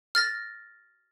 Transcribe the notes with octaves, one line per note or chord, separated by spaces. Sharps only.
F6 A6 A#6